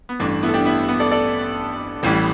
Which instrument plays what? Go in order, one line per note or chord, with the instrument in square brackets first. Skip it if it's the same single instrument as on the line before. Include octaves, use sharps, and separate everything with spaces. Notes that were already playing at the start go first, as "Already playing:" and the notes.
[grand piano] B3
A1 G2 E3 A3 D4
B3 E4
A4
D4 G4
B3 E4
B3
A4 D5
A4 D5
A1 A2 E3 G3